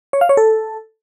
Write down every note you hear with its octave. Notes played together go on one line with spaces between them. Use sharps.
C#5
F5
C#5
A4